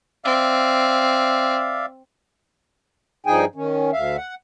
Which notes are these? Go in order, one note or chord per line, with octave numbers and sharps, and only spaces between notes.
C4 D5 E5 F5
G2 F3 D#4 G#4 G5 G#5
D#3 C#4
D2 E5 F5
F#5